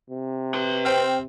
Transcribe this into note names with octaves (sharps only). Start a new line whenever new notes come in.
C3
B4 C6
C4 C5 G5 F6